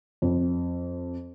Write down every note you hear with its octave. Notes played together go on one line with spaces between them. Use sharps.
F2